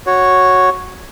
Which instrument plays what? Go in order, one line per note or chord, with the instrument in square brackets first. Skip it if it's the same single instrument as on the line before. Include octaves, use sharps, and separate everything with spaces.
[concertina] F#4 C#5